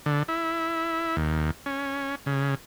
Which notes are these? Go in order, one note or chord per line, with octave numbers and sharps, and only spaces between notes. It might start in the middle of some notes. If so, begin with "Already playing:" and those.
D3
E4
D#2
C#4
C#3